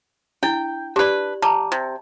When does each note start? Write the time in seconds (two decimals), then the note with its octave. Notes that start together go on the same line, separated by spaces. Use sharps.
0.43 D4 E4 G5
0.96 D4 G4 B4 D5
1.42 G3 A5 A#5
1.72 C3